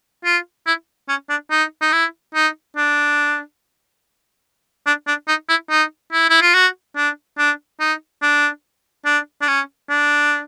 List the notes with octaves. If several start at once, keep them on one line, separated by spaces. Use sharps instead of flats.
F4
E4
C#4
D4
D#4
D#4
E4
D#4
D4
D4
D4
D#4
E4
D#4
E4
E4
F4
F#4
D4
D4
D#4
D4
D4
D4
C#4
D4